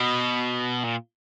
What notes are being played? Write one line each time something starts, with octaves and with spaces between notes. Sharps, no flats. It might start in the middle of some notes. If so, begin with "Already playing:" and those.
Already playing: B2
A#2